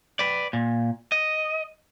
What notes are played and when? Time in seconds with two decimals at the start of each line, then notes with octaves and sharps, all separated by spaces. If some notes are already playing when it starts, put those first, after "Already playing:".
0.19 B4 D5
0.53 A#2
1.12 D#5